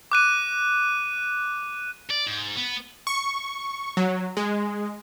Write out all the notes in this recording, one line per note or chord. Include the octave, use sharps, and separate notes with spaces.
D6 F#6 D#7
D5
G#2
B3
C#6
F#3
G#3